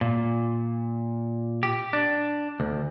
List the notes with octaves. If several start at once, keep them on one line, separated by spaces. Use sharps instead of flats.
A#2
G4
D4
D2